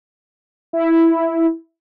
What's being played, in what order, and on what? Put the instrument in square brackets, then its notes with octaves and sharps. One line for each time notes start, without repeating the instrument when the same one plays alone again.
[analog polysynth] E4